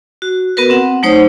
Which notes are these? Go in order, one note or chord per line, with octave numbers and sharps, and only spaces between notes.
F#4
B3 F#4 A#4 B4
C4 F#5
F#3 A3 D#4 C5 C#5 D#6